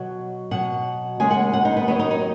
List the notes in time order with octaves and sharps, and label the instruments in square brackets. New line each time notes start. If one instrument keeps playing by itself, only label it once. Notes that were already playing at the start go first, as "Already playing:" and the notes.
Already playing: [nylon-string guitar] B2 F#3 F#5
B2 F#3 F#5
D#2 C#3 G#3 G#5
F#5
F#5
D#4
B3
D#2 D#3 F#3 B3
D#4
D#4